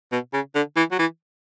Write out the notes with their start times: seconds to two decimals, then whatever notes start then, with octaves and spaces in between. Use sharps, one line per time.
0.12 B2
0.33 C#3
0.55 D3
0.76 E3
0.92 F#3
0.99 E3